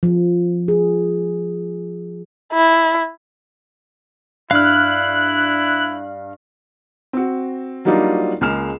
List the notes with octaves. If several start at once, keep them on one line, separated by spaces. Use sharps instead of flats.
F3
G#4
E4
G2 E4 F5 F6 F#6
C4 F#4
F#3 G3 A#3 D4 D#4 F4
C#2 G#3 A#3 F6 E7